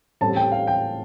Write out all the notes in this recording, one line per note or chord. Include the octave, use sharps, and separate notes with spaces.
A1 A2 G3 C4 A5
G5
F5
G5